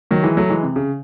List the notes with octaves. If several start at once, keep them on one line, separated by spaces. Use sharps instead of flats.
D#3 F#3
E3 G#3
F#3 A3
E3 G#3
C3
C#3